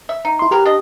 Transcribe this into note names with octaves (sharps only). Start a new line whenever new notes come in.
E5
D#4
E4 C6
F#3 G4 A#4 B4
D4 D#5